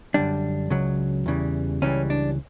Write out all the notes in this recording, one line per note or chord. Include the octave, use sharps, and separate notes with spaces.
F#2 D3 G3 D4
C#2 C#3 F#3
E2 C#3 E3 G3
C#2 C#3 E3 G3 C#4
D4